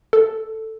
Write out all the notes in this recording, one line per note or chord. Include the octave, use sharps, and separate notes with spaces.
A4